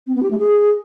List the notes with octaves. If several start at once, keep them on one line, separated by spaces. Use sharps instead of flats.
C4
B3
G4
A3
G#4